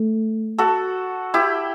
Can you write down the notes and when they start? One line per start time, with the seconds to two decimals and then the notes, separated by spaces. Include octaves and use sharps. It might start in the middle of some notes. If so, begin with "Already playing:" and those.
Already playing: A3
0.58 F#4 A4
1.34 E4 G4